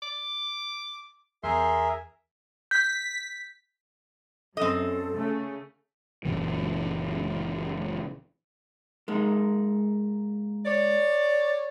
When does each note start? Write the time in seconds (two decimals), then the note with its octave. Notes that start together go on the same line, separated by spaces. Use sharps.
0.03 D6
1.44 E2 G#4 A#4 E5 C6
2.71 G6 B6
4.57 F#2 C4 A4 D#5
5.12 C#3 A3
6.25 F#1 B1 A#2 E3
9.08 G#3 A#3 D#4
10.66 C#5 D5